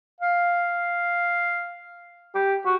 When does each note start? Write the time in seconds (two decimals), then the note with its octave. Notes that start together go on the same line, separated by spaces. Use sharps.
0.20 F5
2.35 G4
2.66 F#4